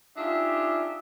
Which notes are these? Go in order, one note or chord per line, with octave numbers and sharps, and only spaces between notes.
D4 D#4 F4 G4 G#4 E5